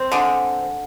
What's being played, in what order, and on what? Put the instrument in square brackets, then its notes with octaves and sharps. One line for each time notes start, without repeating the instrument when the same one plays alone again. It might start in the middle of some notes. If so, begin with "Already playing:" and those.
Already playing: [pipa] C4
D3 G#3